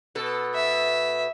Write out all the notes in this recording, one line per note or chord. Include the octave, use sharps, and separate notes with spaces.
B2 A4
E5